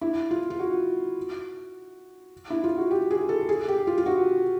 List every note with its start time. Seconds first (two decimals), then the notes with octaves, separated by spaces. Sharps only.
0.01 E4
0.31 F4
0.50 F4
0.59 F#4
2.50 E4
2.64 F4
2.78 F#4
2.91 G4
3.11 G#4
3.29 A4
3.49 G#4
3.68 G4
3.87 F4
3.98 F4
4.06 F#4